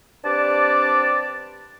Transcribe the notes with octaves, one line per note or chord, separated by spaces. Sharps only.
C4 D4 G4 B4 D5 A5